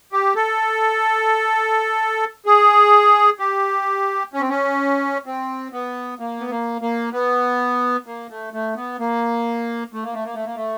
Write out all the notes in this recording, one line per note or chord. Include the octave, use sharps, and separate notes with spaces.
G4
A4
G#4
G4
C#4
C4
C#4
C4
B3
A#3
B3
A#3
A#3
B3
A#3
A3
A3
B3
A#3
A3
A#3
A3
A#3
A3
A#3
A3